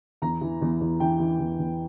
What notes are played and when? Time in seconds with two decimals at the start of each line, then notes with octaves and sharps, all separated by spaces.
0.22 E2 A#5
0.41 E3
0.61 E2
0.81 E2
1.00 E3 G5
1.19 E3
1.39 E2
1.59 E2